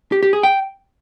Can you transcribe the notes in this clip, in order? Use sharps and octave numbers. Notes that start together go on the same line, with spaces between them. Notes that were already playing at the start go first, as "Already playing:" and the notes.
G4
G4
G#4
G5